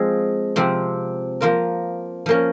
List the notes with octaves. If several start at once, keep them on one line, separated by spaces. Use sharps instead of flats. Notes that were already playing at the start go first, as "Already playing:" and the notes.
Already playing: F3 G#3 C4 F4 G#4
C3 F3 C4
F3 A#3 F4 A#4
F3 A#3 C#4